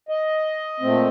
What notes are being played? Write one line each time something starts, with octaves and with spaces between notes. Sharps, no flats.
D#5
A#2 A3 C4